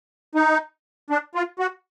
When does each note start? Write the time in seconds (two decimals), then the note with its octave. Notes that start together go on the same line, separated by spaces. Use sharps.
0.35 D#4
1.10 D4
1.35 F4
1.59 F#4